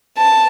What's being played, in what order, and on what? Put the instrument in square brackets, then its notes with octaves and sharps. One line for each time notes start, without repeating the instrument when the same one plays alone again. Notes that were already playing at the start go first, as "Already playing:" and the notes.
[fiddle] A5